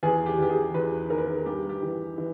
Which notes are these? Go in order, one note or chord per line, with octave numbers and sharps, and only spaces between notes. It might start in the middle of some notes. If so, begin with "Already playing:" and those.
E2 G#4
G4
E2 G4
G#4
E2 B4
D#3 A#4
B4
A#4
G2 G4
G4
E3
E3